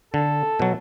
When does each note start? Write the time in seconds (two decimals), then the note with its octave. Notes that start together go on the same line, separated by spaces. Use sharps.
0.14 D3 A4
0.60 B2 F#3